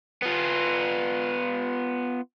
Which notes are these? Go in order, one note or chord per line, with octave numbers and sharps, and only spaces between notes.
B3 F4